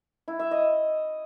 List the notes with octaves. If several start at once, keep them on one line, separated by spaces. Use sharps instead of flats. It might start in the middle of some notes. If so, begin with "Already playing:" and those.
E4
E5
D#5